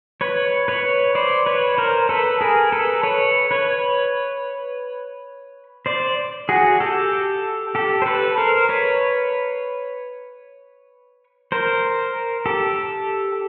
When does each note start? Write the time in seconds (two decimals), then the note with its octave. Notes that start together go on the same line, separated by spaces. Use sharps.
0.21 B4 C#5
0.68 B4 C#5
1.15 C5 D5
1.46 B4 C#5
1.78 A#4 C5
2.09 A4 B4
2.41 G#4 A#4
2.72 A4 B4
3.03 B4 C#5
3.51 B4 C#5
5.86 C5 D5
6.49 F#4 G#4
6.80 G4 A4
7.75 G4 A4
8.02 C5
8.06 A4 B4
8.37 A#4 C5
8.69 B4 C#5
11.52 A#4 C5
12.46 G4 A4